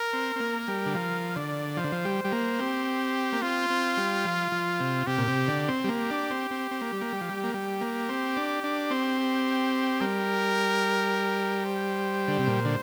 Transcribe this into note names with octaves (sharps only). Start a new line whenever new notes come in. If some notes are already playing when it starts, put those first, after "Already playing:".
Already playing: A#4
C4
C4
A#3
G3
D3
F3 A#4
D3 D5
F3 C5
D3
F3
G3
G3
A#3
C4 G4
A#3
C4 F4
C4
G3
F3
F3
C3
C3 G4
A#2
C3
D3
C4
G3
A#3 G4
D4
C4
C4
C4
A#3
G3
A#3
G3
F3
G3
A#3
G3 G4
A#3
C4
D4
D4
C4
G4
G3 A#4
C5
D3
C3
A#2
D3